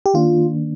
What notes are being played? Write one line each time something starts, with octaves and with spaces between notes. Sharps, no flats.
G4
D#3 A#3 D4 F4